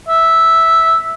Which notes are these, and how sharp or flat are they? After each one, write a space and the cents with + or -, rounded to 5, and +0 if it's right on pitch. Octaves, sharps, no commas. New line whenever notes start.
E5 -5